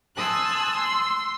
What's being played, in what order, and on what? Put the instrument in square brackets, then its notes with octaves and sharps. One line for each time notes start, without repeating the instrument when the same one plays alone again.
[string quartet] G#5 A5 C6 D#6 E6 F#6
C6 E6